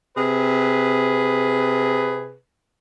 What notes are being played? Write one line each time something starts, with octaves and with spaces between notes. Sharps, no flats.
C3 G#4 B4